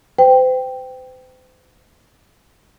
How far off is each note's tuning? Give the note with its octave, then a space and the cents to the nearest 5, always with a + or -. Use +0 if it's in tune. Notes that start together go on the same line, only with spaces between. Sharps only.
C5 -40 G5 +0